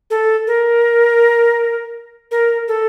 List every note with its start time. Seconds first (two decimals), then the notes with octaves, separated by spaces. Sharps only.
0.10 A4
0.47 A#4
2.31 A#4
2.68 A4